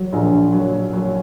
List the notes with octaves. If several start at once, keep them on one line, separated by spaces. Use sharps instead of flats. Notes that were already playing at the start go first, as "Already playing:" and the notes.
Already playing: F#3
A#1
F#3
F#3